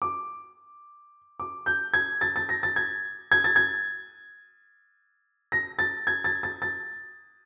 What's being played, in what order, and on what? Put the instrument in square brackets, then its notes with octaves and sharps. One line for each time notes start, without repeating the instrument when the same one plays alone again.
[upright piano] D6
D6
G6
G#6
A6
A6
A#6
A6
G#6
G#6
A6
G#6
A#6
A6
G#6
A6
A6
A6